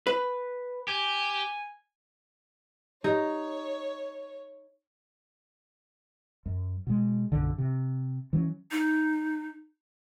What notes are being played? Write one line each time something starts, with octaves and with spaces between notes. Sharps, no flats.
B4
G4 G#5
D#4 G4 C#5
F#2
B2 G#3
B1 F#2 D3
C3
E3 F#3 C4 C#4
D#4